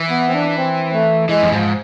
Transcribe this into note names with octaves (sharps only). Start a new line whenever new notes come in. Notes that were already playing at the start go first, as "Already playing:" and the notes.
Already playing: E3
B3
C4
D4
C4
A3
E3 G#3
F2
G#2 F3